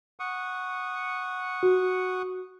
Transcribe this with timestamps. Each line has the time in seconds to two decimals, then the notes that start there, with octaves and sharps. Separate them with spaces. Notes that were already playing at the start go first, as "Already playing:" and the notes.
0.20 F#5 C#6 D#6
1.63 F#4